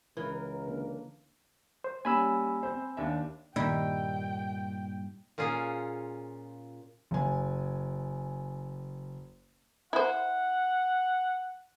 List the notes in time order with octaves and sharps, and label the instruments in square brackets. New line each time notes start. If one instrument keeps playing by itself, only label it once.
[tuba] C#2 [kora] E3 [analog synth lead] A#4
[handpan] D3 A#3 D4
[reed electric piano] C5
[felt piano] G3 A#3 C#4 [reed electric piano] G#5 B5 E6
[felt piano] C4 C5
D#2 D4 E5
[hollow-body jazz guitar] G2 A#2 [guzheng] D#3 G3 E4 [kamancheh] G5
[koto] A#2 C#4 F4 G#4
[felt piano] F#1 G#5
[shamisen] E4 C5 [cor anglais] F#5